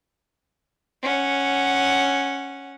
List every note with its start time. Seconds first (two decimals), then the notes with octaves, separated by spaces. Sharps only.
1.03 C#4 F#5